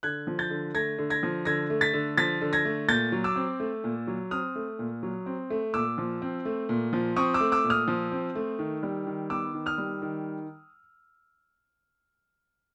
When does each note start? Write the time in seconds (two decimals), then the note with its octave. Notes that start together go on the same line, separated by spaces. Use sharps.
0.03 D3 F#6 G#6
0.27 F3
0.39 G6 A6
0.50 D3
0.75 A3 G#6 A#6
0.98 D3
1.10 G#6 A#6
1.23 F3
1.45 D3 G#6 A#6
1.70 A3
1.81 A6 B6
1.93 D3
2.17 F3 A6 B6
2.41 D3
2.53 G#6 A#6
2.65 A3
2.88 A#2 G6 A6
3.12 F#3
3.24 D6 E6
3.36 C4
3.60 A3
3.84 A#2
4.07 F#3
4.31 C4 D#6 F6
4.56 A3
4.79 A#2
5.03 F#3
5.26 C4
5.50 A3
5.74 A#2 D6 E6
5.98 F3
6.22 C4
6.45 A3
6.69 A#2
6.93 F3
7.16 C4 C#6 D#6
7.34 D6 E6
7.40 A3
7.52 D6 E6
7.64 A#2
7.70 D#6 F6
7.88 F3
8.12 C4
8.35 A3
8.59 D#3
8.83 G3
9.07 D#3
9.30 B3 D6 E6
9.54 D#3
9.66 D#6 F6
9.78 G3
10.02 D#3